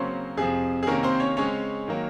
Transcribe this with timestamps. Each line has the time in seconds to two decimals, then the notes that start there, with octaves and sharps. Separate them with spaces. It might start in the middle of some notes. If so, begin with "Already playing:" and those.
Already playing: C#3 F#3 A#3 C4 C#4 C5
0.37 F2 C3 F3 G#4
0.83 G#4
0.87 C3 D#3 A#3 C#4 A#4
1.03 C4 C5
1.20 C#4 C#5
1.37 C#3 G#3 C4 C#4 C#5
1.88 D#3 F#3 A#3